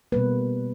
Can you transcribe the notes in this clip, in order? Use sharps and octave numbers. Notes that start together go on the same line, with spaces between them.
B2 G3 A#3 B4